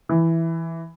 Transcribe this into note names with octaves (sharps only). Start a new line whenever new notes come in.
E3